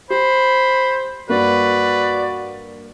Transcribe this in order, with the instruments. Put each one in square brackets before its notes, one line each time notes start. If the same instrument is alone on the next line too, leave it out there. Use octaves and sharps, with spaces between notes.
[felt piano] G4 [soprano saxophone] C5 [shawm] B5
[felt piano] G2 A#3 [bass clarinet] F#4 [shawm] B4 [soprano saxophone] D5